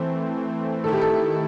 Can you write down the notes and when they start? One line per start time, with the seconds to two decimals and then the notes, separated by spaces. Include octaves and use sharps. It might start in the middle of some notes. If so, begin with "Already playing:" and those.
Already playing: E3 A3 C4 C5
0.84 D#3 A3 E4 A4
0.93 G4
1.02 A4